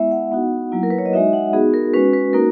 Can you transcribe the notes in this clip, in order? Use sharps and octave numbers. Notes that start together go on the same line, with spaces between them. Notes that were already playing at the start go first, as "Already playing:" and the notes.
Already playing: G#3 B3 E4 E5
F#5
B3 D#4 F#4
F#3 A#3 E4
A#4
B4
C#5
D#5
G#3 D#4 F#4 E5
F#5
B3 D#4 F#4 G#4
A#4
G#3 C#4 F#4 B4
B4
A#3 D#4 F#4 A#4